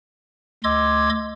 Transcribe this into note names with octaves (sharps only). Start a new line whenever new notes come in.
D2 D#5 C6 D6 E6 G#6